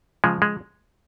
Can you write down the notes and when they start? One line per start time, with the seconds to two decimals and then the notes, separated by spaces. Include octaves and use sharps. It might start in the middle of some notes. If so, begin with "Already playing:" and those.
0.24 C#3 F3 G#3
0.42 G#3